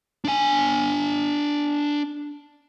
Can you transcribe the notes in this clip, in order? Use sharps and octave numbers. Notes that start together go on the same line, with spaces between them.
D4 G#5